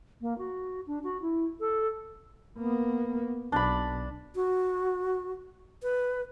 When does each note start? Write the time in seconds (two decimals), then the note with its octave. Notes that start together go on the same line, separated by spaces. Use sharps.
0.21 A#3
0.38 F#4
0.87 D4
1.03 F#4
1.21 E4
1.60 A4
2.59 A#3 B3
3.52 B1 D4 B5
4.35 F#4
5.83 B4